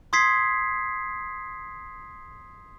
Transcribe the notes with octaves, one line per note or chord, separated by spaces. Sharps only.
C6 D#6 G#6 B6 C7